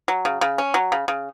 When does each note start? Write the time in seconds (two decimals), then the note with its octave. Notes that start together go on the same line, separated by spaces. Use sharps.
0.08 F#3
0.25 C#3
0.41 C#3
0.58 C#4
0.74 F#3
0.92 C#3
1.08 C#3